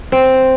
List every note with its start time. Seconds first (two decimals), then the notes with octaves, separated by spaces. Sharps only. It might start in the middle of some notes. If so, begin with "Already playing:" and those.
0.12 C4